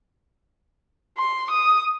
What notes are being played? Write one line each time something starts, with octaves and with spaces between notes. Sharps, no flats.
C6
D#6